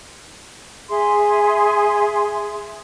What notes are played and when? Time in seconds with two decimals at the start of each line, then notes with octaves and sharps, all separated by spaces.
0.89 G#4 E5 C6